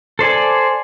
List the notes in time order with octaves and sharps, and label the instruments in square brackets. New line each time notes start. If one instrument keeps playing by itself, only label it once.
[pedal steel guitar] A4 C5 D5 G#5